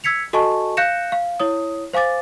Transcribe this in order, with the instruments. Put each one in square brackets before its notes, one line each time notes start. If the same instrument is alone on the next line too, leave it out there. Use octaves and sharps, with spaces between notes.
[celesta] E6 G#6 B6 C#7 F7
F#4 A4 D#5 G#5 A5 C#6
F5 F#6 G6 A#6 C#7 E7
F5
E4 C#5 D#6
C5 F5 G#5 D6 A6